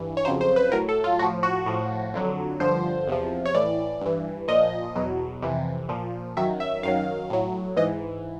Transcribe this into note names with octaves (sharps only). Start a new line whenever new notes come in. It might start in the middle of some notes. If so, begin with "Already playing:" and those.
Already playing: G2 E3
C#5
F2 C#3 F#3 C5
C5
B4
A2 F#3 A#4
A4
F4
A2 F3 F#4
F#4
A2 F3
F2 D3 F#3
G2 D3 F3 C5
E2 C3 F3
C#5
A2 E3 D5
G2 E3
A#2 F3 D#5
E2 B2 F#3
F2 C3 E3
A#2 F3
F#2 D#3 F#3 E5
E5
F#2 D#3 F#3 F5
A2 F#3
G#2 E3 D#5